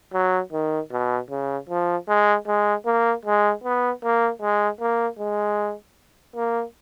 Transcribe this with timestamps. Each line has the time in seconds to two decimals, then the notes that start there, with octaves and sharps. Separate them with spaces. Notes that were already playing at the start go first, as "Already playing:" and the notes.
0.13 F#3
0.53 D#3
0.92 B2
1.30 C#3
1.69 F3
2.09 G#3
2.47 G#3
2.86 A#3
3.25 G#3
3.64 B3
4.03 A#3
4.42 G#3
4.80 A#3
5.19 G#3
6.36 A#3